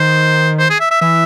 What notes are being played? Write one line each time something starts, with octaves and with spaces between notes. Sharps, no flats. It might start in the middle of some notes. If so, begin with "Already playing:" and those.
Already playing: D#3 C5
C5
G#4
E5
E5
E3 E5